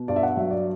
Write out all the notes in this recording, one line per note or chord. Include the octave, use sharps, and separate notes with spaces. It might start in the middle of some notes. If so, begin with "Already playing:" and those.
Already playing: B2
G2 D5
E5
F#5
F#3 E5
D5